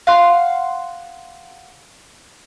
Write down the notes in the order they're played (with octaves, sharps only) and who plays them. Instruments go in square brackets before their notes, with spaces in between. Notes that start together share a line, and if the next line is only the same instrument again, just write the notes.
[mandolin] F5 F#5 C6